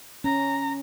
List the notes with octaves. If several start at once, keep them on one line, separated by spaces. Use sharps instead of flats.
C#4 A#5